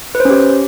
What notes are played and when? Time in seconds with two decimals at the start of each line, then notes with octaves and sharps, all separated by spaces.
0.15 B4
0.20 C5
0.25 C#4
0.30 G4